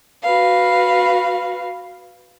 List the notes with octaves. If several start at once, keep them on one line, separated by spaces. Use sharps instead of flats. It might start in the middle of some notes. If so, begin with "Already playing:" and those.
F#4 B4 F5